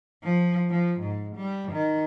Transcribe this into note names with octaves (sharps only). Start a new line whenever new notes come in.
F3
F3
G#2
G3
D#3